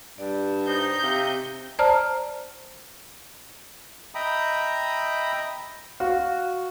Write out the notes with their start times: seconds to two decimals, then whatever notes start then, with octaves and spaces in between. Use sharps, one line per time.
0.18 G2 D5
0.67 D#4 C5 G6
1.03 C3 F5
1.79 C5 D5 A5 A#5 F6
4.14 D#5 E5 G5 A#5 B5 D#6
6.00 F#4 F5